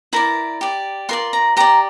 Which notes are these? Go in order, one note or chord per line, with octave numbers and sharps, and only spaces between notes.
E4 A#4 D5 A#5
G4 D5
F4 A#4 D5 C6
A#5
G4 D5 A#5